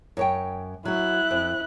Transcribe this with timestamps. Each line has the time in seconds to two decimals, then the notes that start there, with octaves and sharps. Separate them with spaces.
0.17 F#2 C#5 G5
0.85 F#3 E4 F#4 F#6
1.31 F2